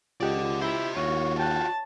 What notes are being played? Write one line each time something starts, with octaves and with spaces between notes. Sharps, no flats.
C#2 F4 G4 D5 D#5 F#5
E4 C5 E5
D#2 F4 F#4 C#5
G5 A5 F#6